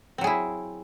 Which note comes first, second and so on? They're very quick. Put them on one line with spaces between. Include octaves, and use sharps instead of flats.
C4 F#3 G#4 E4